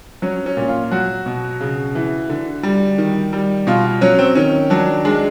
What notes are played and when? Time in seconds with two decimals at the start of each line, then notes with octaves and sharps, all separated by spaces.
0.22 F#3 C#4
0.46 C#4
0.57 A#2
0.68 F4
0.91 F#3 F#4
1.26 B2
1.61 C#3
1.95 E3
2.29 D3
2.63 G3
2.98 D#3
3.33 G3
3.67 B2 F4
4.01 F#3 C#4
4.19 C4
4.35 D#3 C#4
4.70 F#3 D4
5.05 G#3 D4